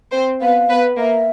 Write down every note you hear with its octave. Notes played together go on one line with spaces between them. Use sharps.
C4 C5
B3 B4 F5
B3 B4
A#3 A#4 E5